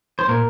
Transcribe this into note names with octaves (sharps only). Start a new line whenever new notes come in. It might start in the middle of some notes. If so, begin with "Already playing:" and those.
C5
A#2 A#4